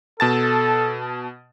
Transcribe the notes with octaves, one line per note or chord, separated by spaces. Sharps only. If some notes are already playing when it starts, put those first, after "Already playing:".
B2 A4 A5 A6